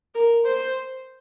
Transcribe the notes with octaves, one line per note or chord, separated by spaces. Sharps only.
A#4
C5